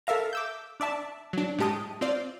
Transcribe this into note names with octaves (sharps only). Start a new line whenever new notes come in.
A4 A#4 E5 F5 A#5
D6 E6 G6
D4 D5 E5 A5
F#3 D4
A2 G#3 G4 A5 D#6
C4 F4 D5